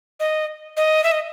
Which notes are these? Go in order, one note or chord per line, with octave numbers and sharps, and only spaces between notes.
D#5
D#5
E5
D#5